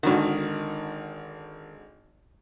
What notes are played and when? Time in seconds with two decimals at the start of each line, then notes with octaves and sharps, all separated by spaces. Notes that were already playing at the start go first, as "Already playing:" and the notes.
0.03 G#1 D3 D#3 F#4